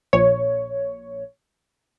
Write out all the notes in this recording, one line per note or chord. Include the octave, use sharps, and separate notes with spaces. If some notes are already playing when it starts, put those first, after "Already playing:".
A#1 C#5